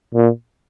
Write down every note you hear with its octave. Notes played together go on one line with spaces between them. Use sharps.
A#2